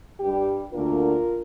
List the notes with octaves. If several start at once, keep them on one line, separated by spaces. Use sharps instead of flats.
G2 G3 D4 G4
D2 D3 A#3 D4 F4 A#4